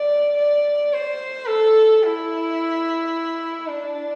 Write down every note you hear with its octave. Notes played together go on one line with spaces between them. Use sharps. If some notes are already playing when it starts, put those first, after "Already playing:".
Already playing: D5
D5
C5
A4
E4
D4